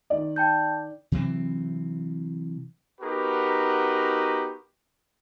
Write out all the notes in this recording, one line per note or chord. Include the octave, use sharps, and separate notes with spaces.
D#3 D5
G5 A5 G6
C3 E3 F#3 C4
B3 D#4 F#4 G4 A#4 B4